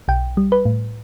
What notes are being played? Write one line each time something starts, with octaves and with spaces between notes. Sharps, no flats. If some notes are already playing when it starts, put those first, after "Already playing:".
B1 G5
G3
B4
A2